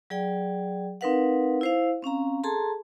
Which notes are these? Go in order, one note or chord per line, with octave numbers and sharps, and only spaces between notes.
F#3 G#4 D5 G5
C4 D#4 A#4 B4 F5 F#5
E4 C5 F5
C4 C#4 F5 A#5
G#4 A4 A5 A#5 C6